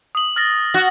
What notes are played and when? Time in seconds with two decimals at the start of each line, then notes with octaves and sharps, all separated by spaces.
0.15 D#6 F#7
0.36 F6 A6 A#6
0.74 F#4